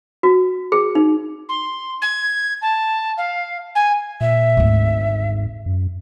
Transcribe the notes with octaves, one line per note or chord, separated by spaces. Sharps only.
F#4
G#4
D#4
C6
G#6
A5
F5
G#5
A#2 E5
G#1 D2 G#2
F#2